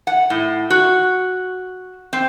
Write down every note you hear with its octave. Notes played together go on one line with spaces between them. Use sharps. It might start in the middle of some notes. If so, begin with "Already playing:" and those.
F#5
A2
F#4
C4